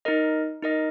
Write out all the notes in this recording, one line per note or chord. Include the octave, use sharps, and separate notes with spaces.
D#4 A#4 D#5
D#4 A#4 D#5